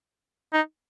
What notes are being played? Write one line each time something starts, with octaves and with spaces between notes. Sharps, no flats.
D#4